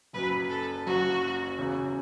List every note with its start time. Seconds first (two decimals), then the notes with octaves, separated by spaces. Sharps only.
0.13 F#1 F#2 F#3 B4
0.50 A4
0.86 F#1 F#2 F#3 F#4
1.58 E2 C#3 F#3